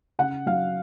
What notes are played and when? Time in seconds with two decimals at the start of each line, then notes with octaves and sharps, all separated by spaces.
0.19 C#3 F#5
0.46 F#3 F5